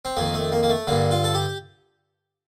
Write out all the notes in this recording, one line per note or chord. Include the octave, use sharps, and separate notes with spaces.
C4
F2 D#3 A#3
A3
A#3
A#3
A3
G2 D3 A#3
F4
A4
G4